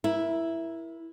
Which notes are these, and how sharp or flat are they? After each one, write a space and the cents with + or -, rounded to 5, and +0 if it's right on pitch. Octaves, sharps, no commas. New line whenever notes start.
E4 +0 A#4 +25